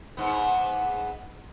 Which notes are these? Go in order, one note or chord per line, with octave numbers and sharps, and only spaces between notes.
G#2 B3